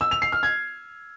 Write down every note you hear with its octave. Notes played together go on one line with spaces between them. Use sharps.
E6
F7
C7
F6
G#6